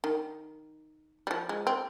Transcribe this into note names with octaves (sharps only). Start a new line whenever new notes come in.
D#3
G3
F3
G#3
C4